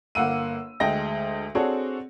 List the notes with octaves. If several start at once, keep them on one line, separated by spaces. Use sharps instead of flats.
G1 A#3 F#5 E6 D#7
D2 G#3 D#5 G5 A#6
C4 D4 F#4 G#4 A4 C#5